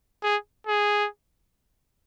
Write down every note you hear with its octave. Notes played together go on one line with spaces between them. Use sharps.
G#4
G#4